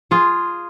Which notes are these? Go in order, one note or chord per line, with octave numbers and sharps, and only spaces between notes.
F4 G#4